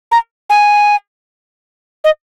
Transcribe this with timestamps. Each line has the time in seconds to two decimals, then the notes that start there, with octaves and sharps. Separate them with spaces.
0.12 A#5
0.50 G#5
2.04 D#5